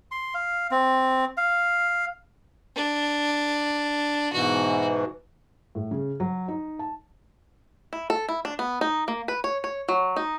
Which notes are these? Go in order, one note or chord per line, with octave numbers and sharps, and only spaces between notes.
C6
F5
C4
F5
D4
G#2 B2 E3 F#4
A2
C#3
F#3
D#4
A5
E4
A4
E4
D4
B3
D#4
A#3
B4
C#5
C#5
F#3
D#4